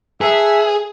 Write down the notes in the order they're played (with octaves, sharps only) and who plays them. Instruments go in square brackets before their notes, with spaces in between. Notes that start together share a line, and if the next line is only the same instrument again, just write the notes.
[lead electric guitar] G#4 [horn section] A4 B4 E5